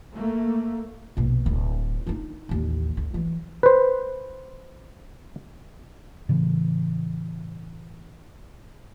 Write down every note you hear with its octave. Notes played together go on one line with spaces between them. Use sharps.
A3 A#3
A#1 B2
D1
D4 D#4
A1 D#2
D2
E3 F#3
B4 C5
A2 C#3 E3